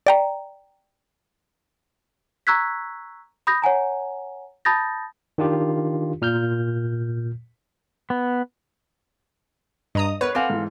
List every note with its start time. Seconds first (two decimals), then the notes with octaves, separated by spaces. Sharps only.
0.07 D5 G5 A#5
2.47 A#5 C#6 E6 F#6 G#6 B6
3.47 B5 D#6 G6 A#6
3.62 C#5 F#5 G#5 A#5
4.65 A5 B5 D#6 G6 A6 A#6
5.38 D#3 D4 F4 G4
6.22 A#2 F6 G6
8.10 B3
9.95 G2 D#5 A#5 D#6
10.21 B3 A#4 B4 C#5
10.35 C4 A4 F5 F#5 G#5 D6
10.50 G#2 E3